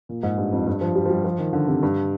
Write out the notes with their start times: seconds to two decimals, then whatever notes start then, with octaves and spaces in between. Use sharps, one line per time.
0.09 A#2
0.23 G#2
0.38 G2
0.52 F2
0.66 G2
0.81 F3
0.95 G3
1.06 F3
1.10 G3
1.25 F3
1.38 D#3
1.53 D3
1.68 C3
1.83 G2